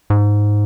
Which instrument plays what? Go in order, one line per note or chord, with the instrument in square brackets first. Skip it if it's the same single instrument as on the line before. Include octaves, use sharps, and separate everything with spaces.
[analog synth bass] G#2